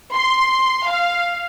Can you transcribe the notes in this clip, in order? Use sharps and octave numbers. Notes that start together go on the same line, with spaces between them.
C6
F5